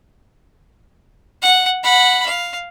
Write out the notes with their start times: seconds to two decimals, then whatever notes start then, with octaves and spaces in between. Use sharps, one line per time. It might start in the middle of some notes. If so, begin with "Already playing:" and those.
1.42 F#5
1.83 F#5 B5
2.26 F5